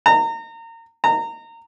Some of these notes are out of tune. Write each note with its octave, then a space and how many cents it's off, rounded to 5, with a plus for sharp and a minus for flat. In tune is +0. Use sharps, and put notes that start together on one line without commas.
A#5 -30
A#5 -25